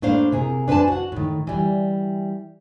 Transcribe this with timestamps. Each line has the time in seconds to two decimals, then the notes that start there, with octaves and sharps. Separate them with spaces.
0.02 A2 A#3 D4 C5 F5
0.32 C3 G#4 A#4
0.68 D4 B4 C5 G#5 A5
0.88 F#4 F#5
1.12 A2 D#3
1.47 E3 G3